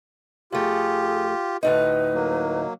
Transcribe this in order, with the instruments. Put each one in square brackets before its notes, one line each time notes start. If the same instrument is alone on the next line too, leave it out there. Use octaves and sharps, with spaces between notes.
[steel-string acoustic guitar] F2 A3 [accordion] F4 G4 [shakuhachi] G#4
[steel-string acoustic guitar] D2 A2 D#4 [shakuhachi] B4
[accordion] F#3 A#3